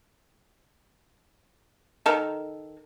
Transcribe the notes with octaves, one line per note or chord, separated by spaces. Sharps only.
D#3 A4 A#4